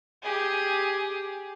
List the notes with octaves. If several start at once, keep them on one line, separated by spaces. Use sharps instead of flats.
G4 G#4